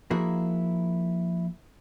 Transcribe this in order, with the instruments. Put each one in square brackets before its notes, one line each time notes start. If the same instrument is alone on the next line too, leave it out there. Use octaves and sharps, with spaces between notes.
[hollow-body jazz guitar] F3 A#3 E4 F#4 G#4 A#4